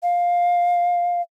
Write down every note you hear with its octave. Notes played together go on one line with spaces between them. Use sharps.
F5